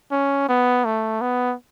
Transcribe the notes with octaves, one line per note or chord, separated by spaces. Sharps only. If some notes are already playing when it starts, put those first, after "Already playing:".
C#4
B3
A3
B3